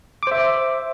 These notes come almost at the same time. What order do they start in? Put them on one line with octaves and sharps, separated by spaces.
D6 C5 E5